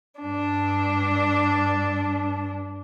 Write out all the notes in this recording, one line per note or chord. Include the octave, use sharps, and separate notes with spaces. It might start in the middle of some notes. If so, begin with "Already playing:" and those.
G2 D4